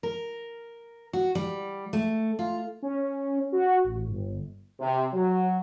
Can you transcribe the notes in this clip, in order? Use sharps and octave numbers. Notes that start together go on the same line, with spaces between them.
A#4
F#4
G3
A3
F4
C#4
F#4
A1
G1
C3
F#3